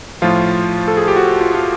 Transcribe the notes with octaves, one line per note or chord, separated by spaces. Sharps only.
A2 F3 F4
A4
G#4
G4
F#4
F4
F4